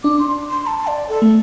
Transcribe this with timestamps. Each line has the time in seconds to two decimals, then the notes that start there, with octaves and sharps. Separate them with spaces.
0.03 D4 D6
0.19 C6
0.50 C6
0.67 A5
0.87 D5
1.08 A4
1.22 A3